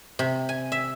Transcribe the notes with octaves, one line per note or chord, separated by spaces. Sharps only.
C3
G#5
E5